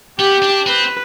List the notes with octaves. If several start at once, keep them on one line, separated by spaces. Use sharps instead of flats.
B3 G4
D4
C4 B4